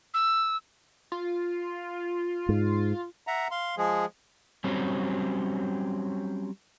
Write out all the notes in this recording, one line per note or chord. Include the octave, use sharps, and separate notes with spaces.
E6
F4
G#2
E5 F#5 A#5
F5 C6
F3 G#3 G#4
F#3 G3 C4 C#4